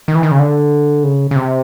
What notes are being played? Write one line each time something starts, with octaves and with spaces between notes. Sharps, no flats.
D#3
E3
D#3
C#3
D3
C#3
C#3
C3